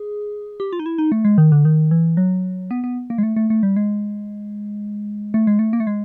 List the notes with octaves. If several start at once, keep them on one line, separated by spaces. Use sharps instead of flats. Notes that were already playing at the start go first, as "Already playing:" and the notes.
Already playing: G#4
G4
F4
D#4
E4
D#4
A3
G#3
D#3
D3
D#3
E3
F#3
B3
B3
A#3
G#3
A3
A3
A3
G3
G#3
A3
G#3
A3
A#3
A3
G#3